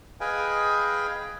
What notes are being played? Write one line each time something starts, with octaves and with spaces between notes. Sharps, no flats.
G#4 B4 D#5 F5 G5 G#5